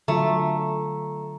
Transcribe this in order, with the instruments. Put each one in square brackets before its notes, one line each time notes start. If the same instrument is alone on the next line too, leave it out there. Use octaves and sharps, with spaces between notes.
[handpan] D3 F#3 F4 [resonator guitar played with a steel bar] A3 [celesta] A#5